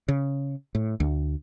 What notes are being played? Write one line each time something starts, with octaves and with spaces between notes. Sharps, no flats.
C#3
A2
D2